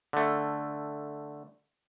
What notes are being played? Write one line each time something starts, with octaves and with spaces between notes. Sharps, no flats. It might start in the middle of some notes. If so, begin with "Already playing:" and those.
D3 A3